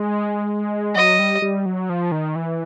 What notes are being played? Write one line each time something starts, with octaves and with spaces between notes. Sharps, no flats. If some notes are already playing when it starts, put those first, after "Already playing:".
Already playing: G#3
F#3 D#5
G3
G3
F#3
F3
D#3
E3